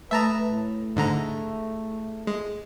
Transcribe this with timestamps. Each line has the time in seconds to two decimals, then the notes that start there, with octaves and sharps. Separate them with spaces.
0.11 A3 B4 E5 A5 A#5 D#6
0.50 A2
0.96 G#2 D3 A3 E4 G#4 A#5
2.27 G#3